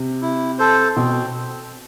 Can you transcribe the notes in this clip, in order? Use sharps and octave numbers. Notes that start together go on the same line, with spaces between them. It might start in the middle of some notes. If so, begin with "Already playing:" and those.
Already playing: C3
E4
A4 C5
B2 C4